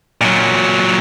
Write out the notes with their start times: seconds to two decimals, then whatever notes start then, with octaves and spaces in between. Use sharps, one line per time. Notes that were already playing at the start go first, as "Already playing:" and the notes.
0.21 A#2 F#3